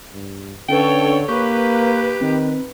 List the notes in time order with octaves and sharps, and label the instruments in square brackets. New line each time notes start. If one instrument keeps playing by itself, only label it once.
[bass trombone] G2
[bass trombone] D3 [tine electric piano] C#4 D4 B4 [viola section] A4 C#5 [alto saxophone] G5
[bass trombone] A#3 [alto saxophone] G4 [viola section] B4 [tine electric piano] C#6
[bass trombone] D#3 [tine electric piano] C4